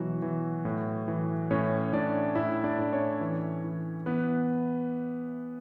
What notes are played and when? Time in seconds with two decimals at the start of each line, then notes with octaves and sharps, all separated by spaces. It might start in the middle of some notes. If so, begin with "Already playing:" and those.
Already playing: B2 E3 F#3 F#4
0.22 E3
0.65 A2
1.08 E3
1.51 A2 C#4 C#5
1.93 A2 D4 D5
2.35 A2 E4 E5
2.64 D4 D5
2.78 A2
2.93 C#4 C#5
3.21 E3
3.64 E3
4.06 E3 B3 B4